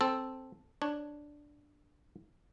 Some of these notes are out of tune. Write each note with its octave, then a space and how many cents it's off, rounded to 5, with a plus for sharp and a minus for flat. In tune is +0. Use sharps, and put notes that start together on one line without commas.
C4 +0 A4 -5
D4 +0 C#5 +0